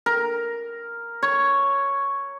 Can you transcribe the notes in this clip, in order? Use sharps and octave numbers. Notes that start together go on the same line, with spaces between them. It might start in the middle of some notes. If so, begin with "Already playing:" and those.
A#4
C#5